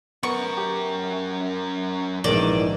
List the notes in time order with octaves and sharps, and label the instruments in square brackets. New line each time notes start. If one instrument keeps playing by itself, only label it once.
[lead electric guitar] F#2 A#4 [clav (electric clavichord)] B3 [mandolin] C#6
[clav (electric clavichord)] G4
[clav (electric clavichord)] A#1 G#2 [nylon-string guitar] D#3 E3 [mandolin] D5